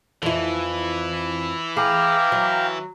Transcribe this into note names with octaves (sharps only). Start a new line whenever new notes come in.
F2 E3 E4
G#4 F5 G5 A#5 D6
F#3